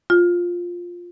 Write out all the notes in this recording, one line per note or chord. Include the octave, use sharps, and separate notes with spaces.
F4